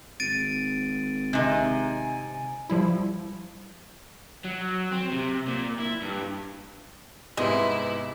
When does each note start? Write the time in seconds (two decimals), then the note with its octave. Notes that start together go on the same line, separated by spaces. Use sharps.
0.20 G#1 A6 D7 D#7
1.33 C3 D#4 G#5
2.70 F3 G3 E4
4.44 F#3
4.92 C4
5.12 C3
5.48 A#2
5.79 E4
6.02 G2
7.37 G#2 C3 G#3 B3 E4